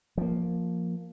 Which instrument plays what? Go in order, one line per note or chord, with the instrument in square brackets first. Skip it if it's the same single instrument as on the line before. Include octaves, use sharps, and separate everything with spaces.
[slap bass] F3 A#3